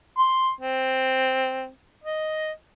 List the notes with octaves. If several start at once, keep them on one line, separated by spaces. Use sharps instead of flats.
C6
C4
D#5